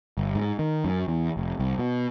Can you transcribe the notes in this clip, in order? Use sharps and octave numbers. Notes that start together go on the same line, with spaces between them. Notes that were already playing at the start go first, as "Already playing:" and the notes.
G1
G#2
D#3
F#2
E2
F1
C2
B2